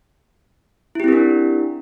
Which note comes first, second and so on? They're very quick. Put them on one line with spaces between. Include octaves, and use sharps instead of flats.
E4 G4 C4 A#4 D4